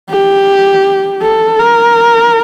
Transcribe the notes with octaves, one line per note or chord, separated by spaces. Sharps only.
G4
A4
A#4